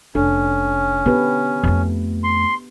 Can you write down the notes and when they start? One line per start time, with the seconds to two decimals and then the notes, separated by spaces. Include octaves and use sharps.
0.15 F1 C#4 D4 A4
1.06 D3 B3 G4 B4
1.64 F2 A3
2.24 C6